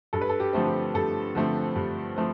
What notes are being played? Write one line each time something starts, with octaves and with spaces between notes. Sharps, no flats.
G2 A4
B4
A4
G4
D3 F3 A3 C4
G4
G2 A4
D3 F3 A3 C4
G2
F3 A3 C4